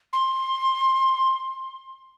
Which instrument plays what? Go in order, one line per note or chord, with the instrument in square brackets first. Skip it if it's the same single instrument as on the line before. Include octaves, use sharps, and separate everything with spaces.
[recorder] C6